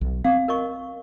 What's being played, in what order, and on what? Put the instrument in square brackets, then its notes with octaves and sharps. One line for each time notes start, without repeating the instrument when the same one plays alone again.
[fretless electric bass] B1
[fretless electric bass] C4 [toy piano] F5
[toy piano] A#4 D#5 C#6